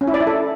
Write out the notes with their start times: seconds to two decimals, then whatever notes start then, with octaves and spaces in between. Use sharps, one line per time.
0.01 C#4
0.07 E4
0.14 D5
0.20 E4
0.27 A4